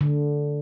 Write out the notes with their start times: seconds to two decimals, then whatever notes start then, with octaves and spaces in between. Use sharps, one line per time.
0.01 D3